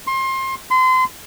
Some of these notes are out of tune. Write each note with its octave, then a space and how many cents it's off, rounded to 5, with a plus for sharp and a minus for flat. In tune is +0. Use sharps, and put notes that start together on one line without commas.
C6 +30
C6 -30